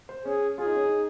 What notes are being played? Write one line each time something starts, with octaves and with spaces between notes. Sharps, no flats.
C5
C#4 G#4
F4 G#4
D#4
C#4
D#4